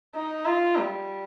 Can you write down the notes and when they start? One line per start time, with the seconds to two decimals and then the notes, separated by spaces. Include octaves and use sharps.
0.15 D#4
0.46 F4
0.77 G3